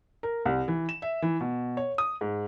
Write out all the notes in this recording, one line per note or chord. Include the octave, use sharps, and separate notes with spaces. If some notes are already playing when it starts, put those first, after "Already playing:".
A#4
C2
E3
E7
E5
E3
B2
C#5
D#6
G#2